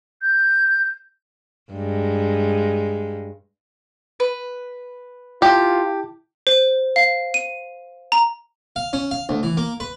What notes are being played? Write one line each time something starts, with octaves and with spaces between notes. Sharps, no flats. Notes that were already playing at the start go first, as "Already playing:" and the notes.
G6
G2 G#3
B4
E4 F4 G4 A5
C5
F5
D#7
A#5
F5
C#4
F5
D2
E3
A#3
B4